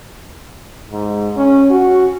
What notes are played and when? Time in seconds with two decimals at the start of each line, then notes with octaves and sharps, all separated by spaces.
0.90 G#2
1.37 C#4
1.70 F#4